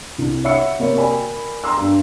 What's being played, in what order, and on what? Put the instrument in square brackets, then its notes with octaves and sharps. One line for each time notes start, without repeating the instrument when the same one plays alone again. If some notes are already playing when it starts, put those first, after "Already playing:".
[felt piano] C2
C#5 E5 F#5 B5 E6 C#7
C3 A#3 A#4 C#5
A#4 D5 G5 G#5 B5
G5 A#5 C6 E6
G2